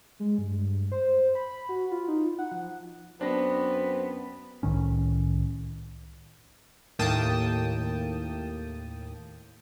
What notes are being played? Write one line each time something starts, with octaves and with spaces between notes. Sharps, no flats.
G#3
G2
G2
C5
B5
F#4
F4
D#4
F#5
F3
F#2 B3 C4 D4 A#6
C2 A2 D#3 C#4
D#2 A2 A#3 G5 A5 D#6